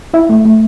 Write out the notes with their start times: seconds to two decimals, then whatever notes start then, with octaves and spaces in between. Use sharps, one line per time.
0.13 E4 E5
0.29 A3
0.45 A3